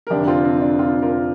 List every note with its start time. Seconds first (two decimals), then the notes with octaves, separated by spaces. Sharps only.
0.07 A#4
0.10 F1 F2 D3 D4 G4
0.27 C4 F4
0.44 C4
0.61 D4
0.79 C4 F4
1.02 F4 A#4